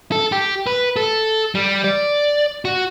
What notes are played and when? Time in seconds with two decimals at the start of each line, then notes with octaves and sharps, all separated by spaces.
0.12 A4
0.32 G4
0.67 B4
0.96 A4
1.55 G3
1.84 D5
2.65 F#4